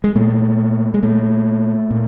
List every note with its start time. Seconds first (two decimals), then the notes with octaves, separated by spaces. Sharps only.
0.04 G#3
0.15 A#2 A3
0.94 G#3
1.03 A#2 A3
1.91 A#2